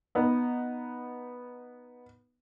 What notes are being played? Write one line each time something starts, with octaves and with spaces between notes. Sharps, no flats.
B3 D#4